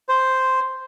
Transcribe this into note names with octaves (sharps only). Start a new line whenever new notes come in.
C5